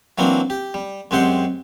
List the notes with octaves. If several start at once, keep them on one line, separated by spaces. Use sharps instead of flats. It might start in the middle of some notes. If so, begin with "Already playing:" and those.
E3 F#3 A#3 C4 D4
G4
G3
F#2 G#3 C4 G4 F#5 C6